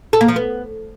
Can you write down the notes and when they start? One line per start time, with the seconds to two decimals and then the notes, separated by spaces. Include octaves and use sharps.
0.13 A4
0.21 A#3
0.28 F3
0.36 B3